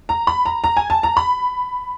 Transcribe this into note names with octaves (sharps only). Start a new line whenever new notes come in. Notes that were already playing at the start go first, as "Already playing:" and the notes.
A#5
B5
A#5
A#5
G#5
A5
A#5
B5